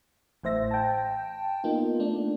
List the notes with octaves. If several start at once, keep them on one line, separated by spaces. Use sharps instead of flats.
A1 A2 C5 E5 A#6
G5 A5
A#3 B3 D#4 F4
A3 D4